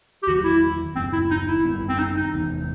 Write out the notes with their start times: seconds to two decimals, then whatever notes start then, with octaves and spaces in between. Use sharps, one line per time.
0.23 G4
0.27 E2 D#3 F#3 F#4
0.44 E4
0.96 F#1 F#2 D#3 C4
1.13 E4
1.31 D#4
1.48 E4
1.65 F#2 D#3 G3 B3
1.89 C4
1.99 D#4
2.16 D#4
2.34 E2 C3 E3 B3